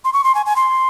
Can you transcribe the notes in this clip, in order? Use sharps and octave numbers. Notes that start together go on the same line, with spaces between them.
C6
C#6
C6
G#5
G#5
C6